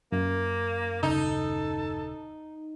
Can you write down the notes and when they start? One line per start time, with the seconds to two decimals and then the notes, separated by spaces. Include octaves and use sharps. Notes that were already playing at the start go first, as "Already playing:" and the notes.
0.12 F#2 A#3
1.03 D#1 C#3 D#4 A4